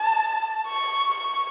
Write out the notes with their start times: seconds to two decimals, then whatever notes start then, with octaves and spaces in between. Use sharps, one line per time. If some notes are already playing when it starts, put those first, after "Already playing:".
Already playing: A5
0.67 C#6
1.14 C#6